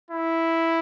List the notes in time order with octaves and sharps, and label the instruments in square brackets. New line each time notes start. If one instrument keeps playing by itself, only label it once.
[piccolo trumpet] E4